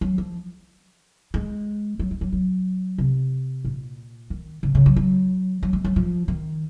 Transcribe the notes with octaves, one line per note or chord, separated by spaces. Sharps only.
F#3
F3
G#3
F#3
G#3
F#3
F#3
C3
A#2
D#3
C#3
C#3
F#3
F#3
F#3
G#3
F#3
F3
D#3